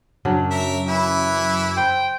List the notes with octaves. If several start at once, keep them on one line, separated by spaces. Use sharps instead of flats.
F#2 C#3 F#3 D4
A#4 E5
E3 E4 E5
C5 G5